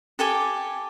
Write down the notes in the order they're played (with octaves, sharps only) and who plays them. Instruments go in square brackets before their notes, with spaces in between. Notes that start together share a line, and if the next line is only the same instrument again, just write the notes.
[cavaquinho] G4 A4 G#5 D6